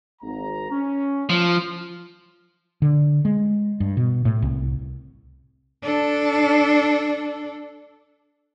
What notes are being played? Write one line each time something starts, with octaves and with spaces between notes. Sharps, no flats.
G#1 A#5
C#4
F3
D3
G#3
G2
B2
A2
C2
D4 A4